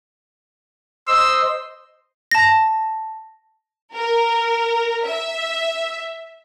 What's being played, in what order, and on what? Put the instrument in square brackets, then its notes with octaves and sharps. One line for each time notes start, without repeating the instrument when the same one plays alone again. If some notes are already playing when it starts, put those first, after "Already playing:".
[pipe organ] C5 D#5 C6 [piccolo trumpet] E6
[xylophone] A5 A#6
[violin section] A#4
E5